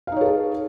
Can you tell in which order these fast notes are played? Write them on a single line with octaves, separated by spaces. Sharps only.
F5 D#4 C#5 A4 G#4